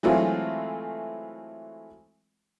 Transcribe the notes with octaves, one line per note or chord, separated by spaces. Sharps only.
E3 F#3 G#3 A3 C4 F4